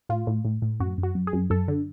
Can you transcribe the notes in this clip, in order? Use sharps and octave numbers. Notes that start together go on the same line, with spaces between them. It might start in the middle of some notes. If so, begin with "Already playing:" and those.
A2 F4
A2
A2
A2
F#2 F#4
F#2
F#4
F#2
G#4
F#2
F#2 A4
D3